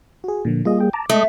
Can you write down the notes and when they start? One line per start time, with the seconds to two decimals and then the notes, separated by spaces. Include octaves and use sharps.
0.24 F#4 G#4
0.45 A#2 D3 F3
0.65 G3 A#3 F4 G#4 D#5
0.80 G5
0.93 A5 A#5 D6
1.10 G#3 A3 D#5 D#6